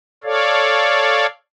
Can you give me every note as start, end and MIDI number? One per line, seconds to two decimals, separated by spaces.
0.24 1.26 69
0.24 1.26 73
0.24 1.26 74
0.24 1.26 77